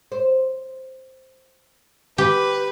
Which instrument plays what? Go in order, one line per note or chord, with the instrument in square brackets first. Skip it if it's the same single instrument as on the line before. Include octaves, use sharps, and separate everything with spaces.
[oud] C5
[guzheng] G4 [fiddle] B4